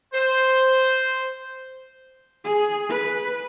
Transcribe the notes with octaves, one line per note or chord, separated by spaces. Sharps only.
C5
G#4
B4